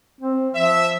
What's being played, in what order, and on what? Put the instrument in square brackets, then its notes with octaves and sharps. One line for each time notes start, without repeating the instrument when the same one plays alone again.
[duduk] C4
[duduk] F3 [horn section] E5